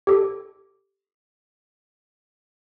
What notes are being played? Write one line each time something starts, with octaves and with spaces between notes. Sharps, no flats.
G4 A4